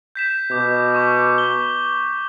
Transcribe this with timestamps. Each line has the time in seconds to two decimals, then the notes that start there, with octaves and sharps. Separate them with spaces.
0.15 G6 B6 E7
0.51 B2 D6 G6
0.95 C#6 D6
1.38 G7